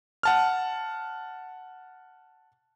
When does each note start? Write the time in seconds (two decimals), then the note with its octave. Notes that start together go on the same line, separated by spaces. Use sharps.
0.23 F#5 A5 F6